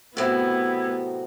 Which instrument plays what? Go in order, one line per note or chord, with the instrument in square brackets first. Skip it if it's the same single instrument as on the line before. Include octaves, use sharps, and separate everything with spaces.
[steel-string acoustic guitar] A2 C3 F#3 [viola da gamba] B3 [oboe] E4